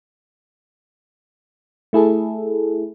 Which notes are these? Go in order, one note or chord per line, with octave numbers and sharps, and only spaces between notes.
A3 E4 G#4 A4